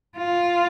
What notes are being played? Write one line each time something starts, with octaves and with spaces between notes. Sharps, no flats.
F4